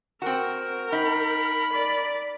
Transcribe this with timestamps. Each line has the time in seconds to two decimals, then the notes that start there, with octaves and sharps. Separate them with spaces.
0.22 C4 F#4 A#4
0.92 D#4 B5
1.72 D5